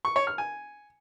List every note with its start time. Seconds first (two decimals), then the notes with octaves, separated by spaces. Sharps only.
0.05 C#6
0.16 C#5
0.27 F6
0.38 G#5